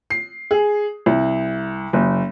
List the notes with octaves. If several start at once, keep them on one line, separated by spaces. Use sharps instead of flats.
C7
G#4
C2
F#1